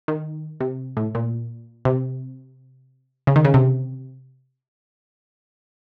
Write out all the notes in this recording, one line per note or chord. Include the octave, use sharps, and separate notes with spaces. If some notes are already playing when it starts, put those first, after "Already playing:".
D#3
C3
A2
A#2
C3
C#3
D#3
C#3
C3